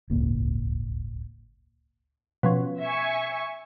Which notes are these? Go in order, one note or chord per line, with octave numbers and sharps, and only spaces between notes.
D1 G1 C#2 A#3
B2 F3 C#4
E5 G#5 C#6